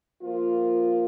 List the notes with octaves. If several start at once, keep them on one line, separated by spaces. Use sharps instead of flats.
F3 A#3 F4